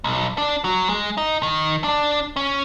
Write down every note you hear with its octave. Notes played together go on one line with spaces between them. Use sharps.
B1
D4
F#3
G#3
D#4
D#3
D4
C#4